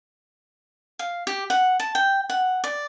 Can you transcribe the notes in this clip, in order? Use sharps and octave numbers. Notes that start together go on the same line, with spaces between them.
F5
G4
F#5
A5
G5
F#5
D5